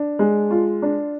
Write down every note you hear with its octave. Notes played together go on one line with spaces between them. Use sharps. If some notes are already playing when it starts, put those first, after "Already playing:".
Already playing: D4
G#3
F4
D4